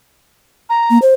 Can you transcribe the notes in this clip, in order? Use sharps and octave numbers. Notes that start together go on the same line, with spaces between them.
A#5
A#3
C5